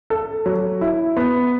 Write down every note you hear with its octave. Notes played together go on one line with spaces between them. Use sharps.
A4
F#3
E4
B3